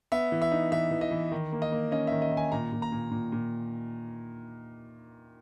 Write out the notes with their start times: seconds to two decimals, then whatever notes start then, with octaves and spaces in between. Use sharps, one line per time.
0.12 B3 E5
0.32 E3
0.42 E5
0.52 D#4
0.72 E3 E5
0.91 E3
1.01 D#5
1.11 E3
1.32 D#3
1.52 A#3
1.62 D#5
1.72 A#3
1.91 C#4 D#5
2.07 D#3 E5
2.22 D#5
2.32 D#3
2.37 G#5
2.52 A#2 A#5
2.72 A#2
2.82 A#5
2.92 A#2
3.11 A#2
3.32 A#2